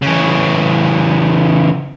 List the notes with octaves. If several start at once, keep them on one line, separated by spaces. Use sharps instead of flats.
C#3 E3